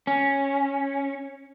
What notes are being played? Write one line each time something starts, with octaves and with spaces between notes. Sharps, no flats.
C#4